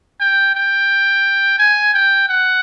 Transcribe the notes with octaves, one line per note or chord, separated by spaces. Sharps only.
G5
G5
G#5
G5
F#5